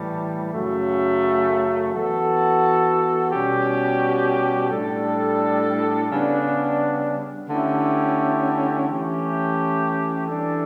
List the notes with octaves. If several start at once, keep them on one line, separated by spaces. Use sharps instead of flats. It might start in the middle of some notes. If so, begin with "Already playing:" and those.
Already playing: A2 E3 G3
F#2 C#3 F#3 A3
E3 B3 F#4 A4
B2 G3 C#4 G4
A2 G3 D4 A4
C#3 G3 B3 D4
D3 A3 C#4 E4 G4
E3 A3 C#4 G4
E3 G3 D4 A4